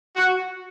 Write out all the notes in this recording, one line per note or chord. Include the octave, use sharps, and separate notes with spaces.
F#4